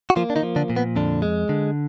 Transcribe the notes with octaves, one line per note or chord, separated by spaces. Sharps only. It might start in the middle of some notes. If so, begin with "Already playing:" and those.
F#4
F3 A#3 F4
D4
D#3 D#4
F3
D3 D4
A#2
B3
F2 D3 D4
G#3
D3